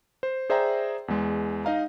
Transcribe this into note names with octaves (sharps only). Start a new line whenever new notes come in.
C5
G#4 C5 D5 E5 G5 A#5
E2 G#3
D#4 D#5 F5 A#5